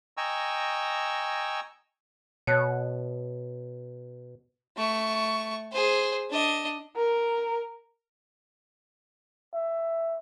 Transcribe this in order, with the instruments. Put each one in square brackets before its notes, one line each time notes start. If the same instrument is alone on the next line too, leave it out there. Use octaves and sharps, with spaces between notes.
[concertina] D#5 G5 G#5 A#5 C#6 E6
[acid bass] B2 [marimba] C#5 A5 F#6
[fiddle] A3 C#6
G#4 C5
D4 D#5
[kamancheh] A#4
[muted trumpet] E5